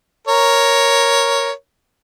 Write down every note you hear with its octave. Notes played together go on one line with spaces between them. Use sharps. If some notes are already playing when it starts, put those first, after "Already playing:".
A#4 C#5